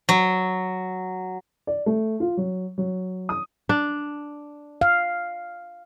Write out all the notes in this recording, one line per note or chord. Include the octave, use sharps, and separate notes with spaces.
F#3
D5
A3
F4
F#3
F#3
D#6
D4
F5